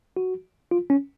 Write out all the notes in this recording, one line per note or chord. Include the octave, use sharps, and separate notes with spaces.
F#4
F4
C#4